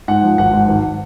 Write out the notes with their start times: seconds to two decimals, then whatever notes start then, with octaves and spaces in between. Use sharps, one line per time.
0.08 G#2 F#5
0.23 F3
0.38 G#1 F#5
0.53 G#2
0.68 G#1